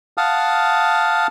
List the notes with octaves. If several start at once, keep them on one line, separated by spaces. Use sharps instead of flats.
F5 F#5 A5 D#6 F6